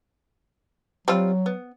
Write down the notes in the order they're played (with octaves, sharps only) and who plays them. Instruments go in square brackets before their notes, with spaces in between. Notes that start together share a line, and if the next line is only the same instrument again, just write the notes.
[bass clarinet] F#3 [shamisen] G3 C4 F4
[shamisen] B3